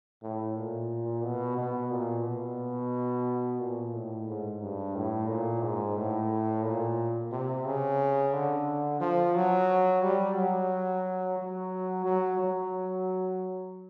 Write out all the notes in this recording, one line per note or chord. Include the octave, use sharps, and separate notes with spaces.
A2
A#2
B2
B2
A#2
B2
A#2
A2
G#2
G2
A2
A#2
G#2
A2
A#2
C3
C#3
D3
F3
F#3
G3
F#3
F#3
F#3
F#3